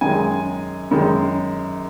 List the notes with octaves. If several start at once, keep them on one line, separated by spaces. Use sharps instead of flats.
F#2 D#3 G#3 G#5
F#2 D#3 G#3